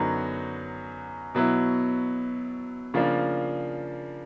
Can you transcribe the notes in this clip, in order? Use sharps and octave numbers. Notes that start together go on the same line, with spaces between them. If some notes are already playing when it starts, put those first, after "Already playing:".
Already playing: F#2 D3 F#3 B3 D#4
B2 F#3 B3 E4
C#3 F3 A#3 D4